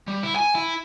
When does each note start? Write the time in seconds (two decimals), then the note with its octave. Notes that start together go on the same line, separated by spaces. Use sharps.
0.08 G3
0.23 E4
0.36 G#5
0.55 E4